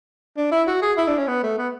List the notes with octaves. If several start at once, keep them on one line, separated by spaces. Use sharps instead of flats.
D4
E4
F#4
G#4
E4
D4
C#4
B3
A3
B3